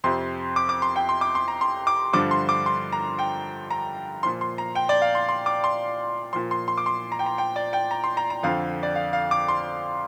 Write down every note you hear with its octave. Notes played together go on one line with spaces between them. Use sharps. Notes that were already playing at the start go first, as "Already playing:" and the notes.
F2 C3 F3 C6
D6
D6
C6
G5
C6
D6
C6
A#5
C6
D6
G2 D3 F3 D6
C6
D6
C6
A#5
G5
A#5
A#2 F3 C6
C6
A#5
G5
D5
F5
C6
C6
D6
C6
A#2 F3 C6
C6
C6
D6
C6
A#5
G5
A#5
G5
D5
G5
A#5
C6
A#5
A#5
F2 D3 F3 F5
D5
F5
F5
D6
C6